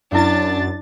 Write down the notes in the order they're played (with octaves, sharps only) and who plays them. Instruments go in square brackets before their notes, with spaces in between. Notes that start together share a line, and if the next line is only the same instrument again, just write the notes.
[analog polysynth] F#2 A6 [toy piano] C#4 E4 [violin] D4